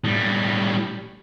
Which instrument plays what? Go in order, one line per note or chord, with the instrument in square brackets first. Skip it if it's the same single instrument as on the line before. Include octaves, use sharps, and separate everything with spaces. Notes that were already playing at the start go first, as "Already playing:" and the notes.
[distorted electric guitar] A2 G3